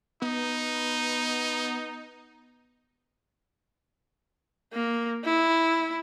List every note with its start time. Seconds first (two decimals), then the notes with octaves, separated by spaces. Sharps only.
0.22 B3 D#4
4.73 A#3
5.25 E4